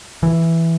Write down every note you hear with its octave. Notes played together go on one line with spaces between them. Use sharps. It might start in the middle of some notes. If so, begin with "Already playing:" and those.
E3